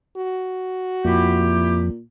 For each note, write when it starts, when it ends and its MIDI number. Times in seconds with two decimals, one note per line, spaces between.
0.17 1.54 66
1.05 1.90 41
1.05 2.02 46
1.05 1.81 64
1.05 1.81 67